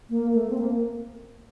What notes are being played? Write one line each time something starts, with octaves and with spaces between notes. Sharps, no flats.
A#3
A3
C4
A#3